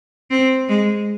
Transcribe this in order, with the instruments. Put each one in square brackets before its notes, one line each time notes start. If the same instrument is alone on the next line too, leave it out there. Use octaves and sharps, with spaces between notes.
[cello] C4
G#3